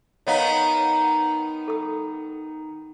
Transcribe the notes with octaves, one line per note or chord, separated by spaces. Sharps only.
D#3 B3 D#4 C#5 D#5 F5
A4 D#6